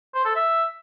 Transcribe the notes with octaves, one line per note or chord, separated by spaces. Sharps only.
C5
A4
E5